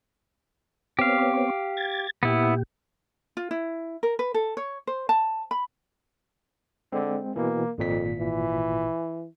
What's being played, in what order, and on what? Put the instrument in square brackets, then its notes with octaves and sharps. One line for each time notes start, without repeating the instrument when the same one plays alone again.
[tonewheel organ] B3 C4 C#5 [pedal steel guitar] G4 F5
[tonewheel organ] G#6 A6
[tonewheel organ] A#2 G4 [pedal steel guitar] B3 E4
[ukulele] F4
E4
A#4
B4
A4
C#5
C5
A5
B5
[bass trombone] D3 [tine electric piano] G#3 C4
[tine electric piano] B2 E3 [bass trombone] A#3
[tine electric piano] G#1 A#2 B6 [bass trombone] F2
[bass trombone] E3